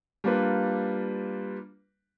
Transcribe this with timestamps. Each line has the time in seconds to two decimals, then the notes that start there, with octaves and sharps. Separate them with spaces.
0.24 G3 A#3 D4 F4 B4